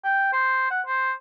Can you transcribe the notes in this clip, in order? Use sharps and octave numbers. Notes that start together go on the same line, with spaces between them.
G5
C5
F#5
C5